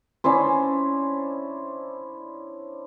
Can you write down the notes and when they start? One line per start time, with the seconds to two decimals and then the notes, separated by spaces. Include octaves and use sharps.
0.24 C#4 D4 E4 C5